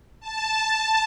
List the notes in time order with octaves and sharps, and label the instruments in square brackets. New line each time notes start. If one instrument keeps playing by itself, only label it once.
[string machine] A5